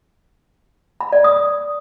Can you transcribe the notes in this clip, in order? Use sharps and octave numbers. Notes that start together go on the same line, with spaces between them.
B5
D5
D#6